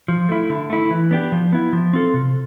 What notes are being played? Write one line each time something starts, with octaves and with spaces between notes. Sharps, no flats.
F3
A3 E4
D3
A3 E4
E3
B3 D4 G4
F3
B3 E4
F3
C4 F4 A4
C3